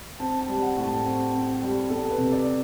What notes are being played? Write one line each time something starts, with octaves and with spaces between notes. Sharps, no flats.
C4 A5
A5
G3
F#5
A2
A5
C4
C4
G3
E2 A4
B4
C3
D5